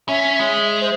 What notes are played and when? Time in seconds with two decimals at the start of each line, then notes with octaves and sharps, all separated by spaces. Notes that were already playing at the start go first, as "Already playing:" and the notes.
0.08 C#4 E5
0.39 G#3
0.81 C5